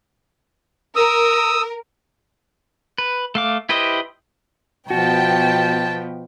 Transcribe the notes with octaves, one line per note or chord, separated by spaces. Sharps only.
A#4 D#6 E6
B4
A3 F5 D6
E4 G4 B4 C5 D#5
B2 F3 B3 F#4 G5 A5